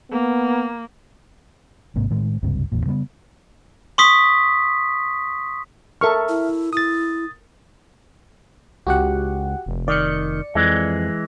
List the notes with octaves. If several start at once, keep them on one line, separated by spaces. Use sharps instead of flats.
A#3 B3
G#1 G#2 C3 A#3
A2 D#3 G#3
F#1 C#2 G2 C3
A1 E2 A#2
C#3 G3 A3 B3
C6 C#6 D#6 B6
A4 A#4 E5 C#6 F6
E4
E4 D#6 A6
C#2 F#4 G4 F#5
F1
D#3 D5 C#7
F2 E3 G#3